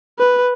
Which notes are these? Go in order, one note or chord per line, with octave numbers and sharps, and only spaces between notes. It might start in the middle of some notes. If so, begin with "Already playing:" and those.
B4